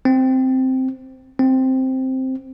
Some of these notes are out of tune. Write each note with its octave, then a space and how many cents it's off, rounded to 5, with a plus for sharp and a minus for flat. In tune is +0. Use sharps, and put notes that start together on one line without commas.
C4 -5
C4 +0